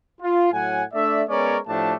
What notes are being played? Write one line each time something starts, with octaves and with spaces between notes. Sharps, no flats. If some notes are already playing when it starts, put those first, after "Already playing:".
F4
A2 F#3 F#5 G#5
A3 D4 D5 E5
G#3 B3 C#4 A#4 C#5 D5
A2 F3 A3 D4 G4 A5